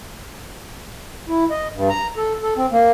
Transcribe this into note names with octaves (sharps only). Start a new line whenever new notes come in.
E4
D#5
G2
A#5
A4
A4
C4
A#3